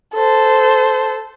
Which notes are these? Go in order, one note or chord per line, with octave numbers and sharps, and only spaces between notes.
A4 C5